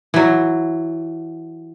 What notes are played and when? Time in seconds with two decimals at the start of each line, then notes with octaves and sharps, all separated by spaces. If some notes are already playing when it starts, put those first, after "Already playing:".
0.14 E3 F#3